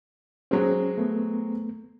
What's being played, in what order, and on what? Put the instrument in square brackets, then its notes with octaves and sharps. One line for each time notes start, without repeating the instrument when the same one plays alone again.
[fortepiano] F#3 G#3 C4 [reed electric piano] C#4
[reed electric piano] A3 B3